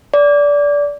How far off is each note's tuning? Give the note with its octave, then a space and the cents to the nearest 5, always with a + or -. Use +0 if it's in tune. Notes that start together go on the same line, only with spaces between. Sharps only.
D5 -20